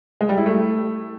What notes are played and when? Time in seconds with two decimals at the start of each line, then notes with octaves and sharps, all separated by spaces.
0.21 G#3
0.29 G3
0.37 E4
0.46 A3